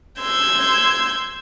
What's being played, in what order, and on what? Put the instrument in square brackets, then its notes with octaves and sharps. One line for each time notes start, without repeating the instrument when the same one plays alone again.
[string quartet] C6 E6 G6 G#6